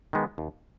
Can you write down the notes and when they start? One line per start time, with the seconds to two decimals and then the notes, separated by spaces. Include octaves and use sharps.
0.13 D#3 G#3 B3
0.38 D#2